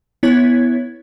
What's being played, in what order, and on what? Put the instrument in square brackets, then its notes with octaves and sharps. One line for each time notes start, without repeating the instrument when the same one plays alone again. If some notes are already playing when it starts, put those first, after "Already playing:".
[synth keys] B3 E4 C#5 G#6 B6